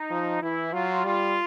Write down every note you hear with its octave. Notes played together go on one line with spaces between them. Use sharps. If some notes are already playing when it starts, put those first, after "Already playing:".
Already playing: D#4
F3
E3 E4
F#3 F4
G3 F4